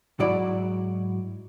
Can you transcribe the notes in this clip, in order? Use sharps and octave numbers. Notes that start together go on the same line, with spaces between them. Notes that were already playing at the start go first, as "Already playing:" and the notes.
G#2 F#3 E4 F#4 D5 B5